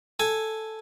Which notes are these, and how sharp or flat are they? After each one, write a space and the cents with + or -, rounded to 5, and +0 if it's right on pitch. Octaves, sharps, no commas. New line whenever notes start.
A4 +0 G#5 +0